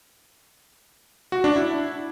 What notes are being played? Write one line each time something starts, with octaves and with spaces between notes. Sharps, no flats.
F#4
D4
E4